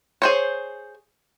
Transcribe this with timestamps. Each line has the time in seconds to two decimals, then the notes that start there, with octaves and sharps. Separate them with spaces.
0.22 G#4 C5 C#5